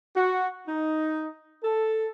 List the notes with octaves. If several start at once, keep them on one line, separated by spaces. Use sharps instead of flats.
F#4
D#4
A4